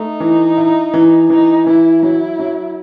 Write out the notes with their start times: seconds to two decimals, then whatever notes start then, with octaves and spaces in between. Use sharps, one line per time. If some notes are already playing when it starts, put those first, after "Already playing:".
Already playing: A3 D#4
0.20 E3
0.57 E4
0.94 E3
1.30 E3 D#4
1.67 E3 E4
2.02 F#3 E4
2.39 F#3